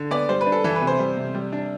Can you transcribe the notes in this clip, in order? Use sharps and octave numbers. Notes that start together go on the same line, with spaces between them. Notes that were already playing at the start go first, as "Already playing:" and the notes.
Already playing: D3
B3 D5
G3 C5
B4
D4
A4
E3 A4
B4
C3
C5
G3
C3
G3
D4